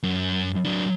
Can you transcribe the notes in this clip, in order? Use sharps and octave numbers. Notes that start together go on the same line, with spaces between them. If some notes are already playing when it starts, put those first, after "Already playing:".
F#2
F#3 D4